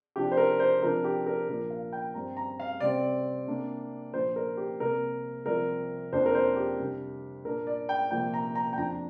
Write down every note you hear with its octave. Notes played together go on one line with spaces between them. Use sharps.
C3 F3 D4 G4
C5
A#4
C5
C3 F3 D4 A#4
G4
A#4
A#2 F3 D4 A#4
F5
G5
G2 G3 C4 A#5
A#5
F5
C2 C3 G3 C4 D5
C3 A#3 D4
A#2 F3 D4 C5
A#4
G4
C2 C3 A#3 A#4
C2 C3 F3 A#4
F2 C3 A#3 D4 C5
A#4
C5
G4
C2 C3 G3 D4
A#2 A#3 D4 A#4
D5
G5
C2 A#2 F3 A#3 G5
A#5
A#5
G5
F2 F3 D4 A#5